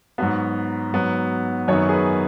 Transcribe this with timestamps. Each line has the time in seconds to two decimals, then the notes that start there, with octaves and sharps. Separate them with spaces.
0.18 G#2 F#3 B3 F#4
0.93 G#2 F#3 B3
1.68 F#2 D#3 B3 C#5
1.89 G#4
1.93 B4